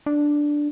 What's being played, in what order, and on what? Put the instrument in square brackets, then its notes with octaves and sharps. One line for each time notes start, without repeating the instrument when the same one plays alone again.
[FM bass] D4